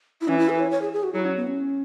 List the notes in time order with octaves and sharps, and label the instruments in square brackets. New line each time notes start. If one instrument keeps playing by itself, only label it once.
[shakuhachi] E4
[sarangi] E3 [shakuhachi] C#4
[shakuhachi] E4
B4
C#5
C#5
G#4
G#4
F#4
[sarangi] F#3 [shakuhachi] E4
[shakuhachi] C#4
B3
C#4